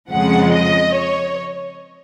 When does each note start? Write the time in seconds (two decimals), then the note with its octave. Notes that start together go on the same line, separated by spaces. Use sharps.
0.10 F2 C#3 F3 G#3 F#5
0.52 D#5
0.94 C#5